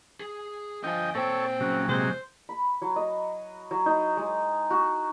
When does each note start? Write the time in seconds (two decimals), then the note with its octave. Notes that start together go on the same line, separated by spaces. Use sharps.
0.20 G#4
0.84 D3 F3 D#5 G5 G#5
1.15 A#2 C4 A4 C#5 G5
1.60 C#3 F#3
1.89 C3 F#3 G#3 C5
2.49 B5
2.82 F#3
2.96 D#5
3.71 F#3
3.86 D#4
4.17 G#3
4.70 F#4